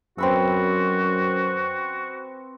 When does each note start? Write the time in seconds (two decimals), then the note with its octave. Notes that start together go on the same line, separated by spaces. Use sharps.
0.18 F#2 C4 F#4 B4 E6